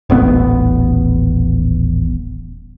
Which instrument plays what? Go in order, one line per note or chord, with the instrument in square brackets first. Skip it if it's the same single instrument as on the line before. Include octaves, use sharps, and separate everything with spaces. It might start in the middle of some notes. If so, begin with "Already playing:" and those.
[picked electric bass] D#1 A1 B3